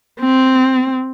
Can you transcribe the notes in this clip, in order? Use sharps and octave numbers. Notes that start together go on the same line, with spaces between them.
C4